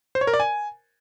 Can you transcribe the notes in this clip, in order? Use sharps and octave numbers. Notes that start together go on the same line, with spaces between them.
C5
C#5
A#4
D5
G#5